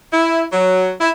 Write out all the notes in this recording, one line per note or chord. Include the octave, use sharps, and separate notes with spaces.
E4
F#3
E4